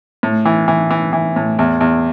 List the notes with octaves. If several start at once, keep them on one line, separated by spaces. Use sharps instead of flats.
A2
E3
E3
E3
E3
A2
E2
E2